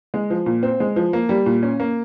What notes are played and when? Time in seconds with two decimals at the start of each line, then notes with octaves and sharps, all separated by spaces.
0.14 G#3
0.30 F3
0.46 A#2
0.63 C4
0.80 G#3
0.96 F3
1.13 A#3
1.29 G3
1.46 A#2
1.63 C#4
1.80 A#3